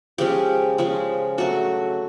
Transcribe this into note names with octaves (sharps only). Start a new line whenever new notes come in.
C#3 F3 G#3 C#4 G4
C#3 F3 G#3 C#4
C#3 F#3 A3 D4 F#4